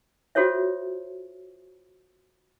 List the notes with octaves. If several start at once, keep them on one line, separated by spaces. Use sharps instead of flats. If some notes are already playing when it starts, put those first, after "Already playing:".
F4 F#4 A4 C5 C#5 E5